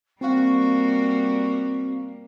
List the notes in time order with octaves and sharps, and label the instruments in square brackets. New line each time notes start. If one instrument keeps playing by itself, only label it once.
[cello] G3 A#3 [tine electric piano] C4 F5 [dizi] F#4